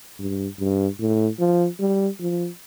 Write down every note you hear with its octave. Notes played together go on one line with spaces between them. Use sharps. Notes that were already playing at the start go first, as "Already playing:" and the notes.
G2
G2
A2
F3
G3
F3